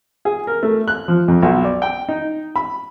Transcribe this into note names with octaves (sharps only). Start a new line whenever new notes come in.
G#4
A#4
A3
F#6
F3
F2
B1
D5
G5
D#4
B5